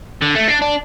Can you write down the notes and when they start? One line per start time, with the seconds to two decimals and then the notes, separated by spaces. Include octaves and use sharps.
0.22 D3
0.36 A3
0.48 D4
0.62 D4